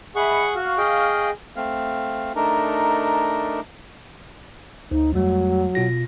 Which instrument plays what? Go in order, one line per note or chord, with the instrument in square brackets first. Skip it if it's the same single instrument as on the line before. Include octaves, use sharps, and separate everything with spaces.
[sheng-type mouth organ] G#4 F#5 C#6 [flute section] D#5 E5 B5
[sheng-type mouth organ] F#4 [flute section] F5 C#6 F6
[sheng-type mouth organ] G#4 D#5 G5
[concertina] A3 C4 F5
A3 D4 D#4 A#4
[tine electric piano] D2 [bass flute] D#4
[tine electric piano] F2 G3 A3 [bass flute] F#3
[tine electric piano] B2 F4 A#6